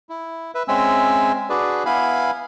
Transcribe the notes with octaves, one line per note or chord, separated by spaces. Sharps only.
E4
B4 E5
G#3 C4 C#4 E5 G#5 E6
D4 F#4 G#4 B4 D5
B3 E4 F5 G#5 B5